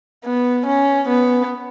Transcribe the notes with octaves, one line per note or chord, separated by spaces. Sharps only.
B3
C#4
B3